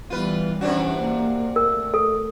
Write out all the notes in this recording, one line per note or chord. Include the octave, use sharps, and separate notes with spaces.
E3 G3 B3 F4 B4
C3 E3 C#4 D4 F#4
A#3
A3 A#4
A4